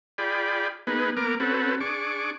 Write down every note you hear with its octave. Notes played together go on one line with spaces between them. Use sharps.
F4 G#4 D5 G5 B5
A#3 B3 D#4 G#4 B4
A#3 B3 A#4 D6 F6
C4 C#4 F#4 A4 B4
D4 G#4 C#6 D6